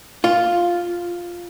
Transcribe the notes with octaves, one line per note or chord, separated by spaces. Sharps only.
F4